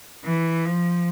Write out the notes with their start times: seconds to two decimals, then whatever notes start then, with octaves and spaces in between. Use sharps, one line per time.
0.25 E3
0.65 F3